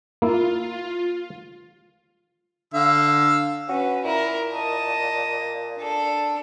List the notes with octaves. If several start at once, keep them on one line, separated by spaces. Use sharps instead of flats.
A#3 E4 F4
D3 F5 E6
C#4 F#4 B4
A#2 E4 A#4
D#5 A5
D4 A4